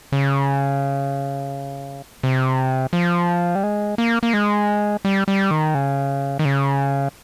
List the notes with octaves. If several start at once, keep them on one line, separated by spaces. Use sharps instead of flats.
C#3
C3
F3
G3
G#3
A#3
A#3
G#3
G3
G3
D#3
C#3
D#3
C#3